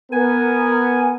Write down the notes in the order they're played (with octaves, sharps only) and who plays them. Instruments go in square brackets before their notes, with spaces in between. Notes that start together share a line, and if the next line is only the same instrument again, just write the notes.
[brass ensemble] B3 A#4 [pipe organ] G#5